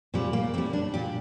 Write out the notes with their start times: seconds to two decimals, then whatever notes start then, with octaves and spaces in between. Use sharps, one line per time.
0.14 A#2 G3 C4
0.33 A#3
0.54 A#2 G3 C4
0.73 D4
0.94 A#2 G3 G4